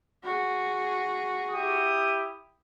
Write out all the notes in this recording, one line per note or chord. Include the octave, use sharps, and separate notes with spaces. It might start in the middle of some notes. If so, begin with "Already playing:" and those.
F#4 G#4
E4 G4 D#6